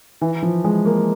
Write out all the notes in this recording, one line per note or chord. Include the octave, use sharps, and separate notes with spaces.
E3
F3
G#3
A#3